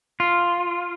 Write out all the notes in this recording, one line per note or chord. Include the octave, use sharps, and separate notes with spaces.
F4